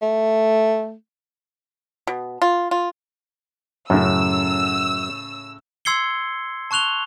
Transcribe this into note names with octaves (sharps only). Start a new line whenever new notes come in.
A3
B2
F4
F4
F#2 A2 C#3 E6
C6 E6 G#6 C7 C#7 G7
A5 C#6 F#6 F7 G7